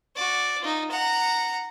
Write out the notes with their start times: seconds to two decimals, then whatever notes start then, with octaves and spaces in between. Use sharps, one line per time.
0.16 F#4 D5
0.61 D#4 F4
0.90 F#5 A#5